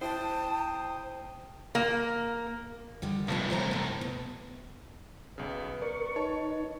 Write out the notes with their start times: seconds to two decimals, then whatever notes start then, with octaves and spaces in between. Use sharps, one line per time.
0.01 E4 C5 G5 A5 D#6
1.75 A#3
3.02 D3 D#3 G3
3.28 C2 A2 F3 B3 D4
3.50 F#3 C5 A#5
3.71 G#2 A3
4.01 B2
5.38 B1 C#3 B4
5.82 A#4 D5 C#6
6.16 D#4 C#5 A5 C#6